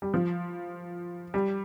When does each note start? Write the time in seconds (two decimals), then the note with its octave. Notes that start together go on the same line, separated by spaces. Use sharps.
0.02 G3
0.14 F3
1.34 G3